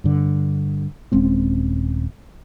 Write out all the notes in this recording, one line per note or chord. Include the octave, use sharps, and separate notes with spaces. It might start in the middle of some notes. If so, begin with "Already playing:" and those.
G2 D3
D#1 G#3 C4 C#4